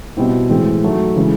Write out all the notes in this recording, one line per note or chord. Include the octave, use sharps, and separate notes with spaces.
B2 G3 C4 E4
A2 E3 G#3 C4
D#3 F#3 A3
C#3 E3 G#3